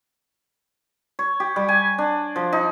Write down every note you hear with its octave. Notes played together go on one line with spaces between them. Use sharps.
C#5
G4
G3
G#5
D4
F3
D#4